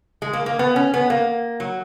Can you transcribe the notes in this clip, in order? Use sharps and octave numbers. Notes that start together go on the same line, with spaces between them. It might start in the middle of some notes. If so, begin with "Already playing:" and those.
G#3
A#3
A#3
B3
C#4
B3
A#3
F#3